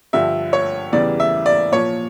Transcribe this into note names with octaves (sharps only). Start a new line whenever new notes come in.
G2 D3 F3 E5
C#5
E2 C#3 E3 G3 D5
E5
D5
A#2 F3 C#5